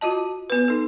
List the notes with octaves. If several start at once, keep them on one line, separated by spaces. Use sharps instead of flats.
F4 F#4 D#5 A5
B3 B4
D#4 A4